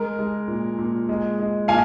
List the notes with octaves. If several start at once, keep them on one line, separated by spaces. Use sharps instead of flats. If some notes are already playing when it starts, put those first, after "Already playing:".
Already playing: G#3 A#4
G#3
A#2
A#2
G#3
G#3
A#2 F5 G#5